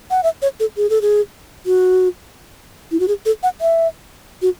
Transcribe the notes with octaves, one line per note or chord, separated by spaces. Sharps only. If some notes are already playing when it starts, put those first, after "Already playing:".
F#5
E5
C#5
A4
G#4
A4
G#4
F#4
E4
F#4
G#4
A4
F#5
E5
F#4